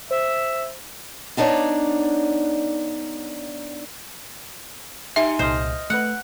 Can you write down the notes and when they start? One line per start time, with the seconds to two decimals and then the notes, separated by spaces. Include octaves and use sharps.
0.11 C5 E5
1.37 B3 D4 D#4 C#5 D5
5.16 D#4 G4 E5 G#5 C6 C#7
5.39 C2 A#2 C5 D#5 D#6 F6
5.90 A3 B4 F#5